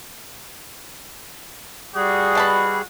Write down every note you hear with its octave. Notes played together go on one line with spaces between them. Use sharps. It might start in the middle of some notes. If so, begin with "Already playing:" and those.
G3 F#4 G#4
B2 A5 B5